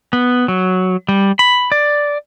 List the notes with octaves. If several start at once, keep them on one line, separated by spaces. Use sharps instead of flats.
B3
F#3
G3
B5
D5